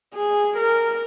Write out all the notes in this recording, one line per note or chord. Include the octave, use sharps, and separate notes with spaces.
G#4
A#4